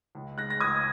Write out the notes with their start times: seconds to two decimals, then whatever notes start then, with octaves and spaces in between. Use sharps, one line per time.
0.15 C#2
0.37 G#3 F#6 A#6
0.50 A#6
0.61 C#2 D#6 G#6